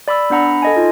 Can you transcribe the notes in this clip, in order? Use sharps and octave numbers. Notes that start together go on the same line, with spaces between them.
D5 B5 D6 E6
B3 D4 F#5 A#5 B5
A4 D#5 G#5
D#4 F4